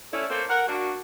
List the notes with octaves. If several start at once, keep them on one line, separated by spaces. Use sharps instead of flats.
A3 C#4 E4 C#5 D5
A3 A#3 C5
A#4 F#5
A#3 D4 F#4